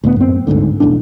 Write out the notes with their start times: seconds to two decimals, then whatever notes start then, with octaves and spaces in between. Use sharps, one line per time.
0.04 D2 A2 B3
0.16 F#2 C4
0.47 G1 D2 G#2 D3
0.80 E1 B1 A2 D4